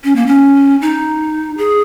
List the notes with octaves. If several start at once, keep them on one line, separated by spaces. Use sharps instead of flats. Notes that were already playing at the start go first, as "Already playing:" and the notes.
C#4
A#3
C#4
D#4
G#4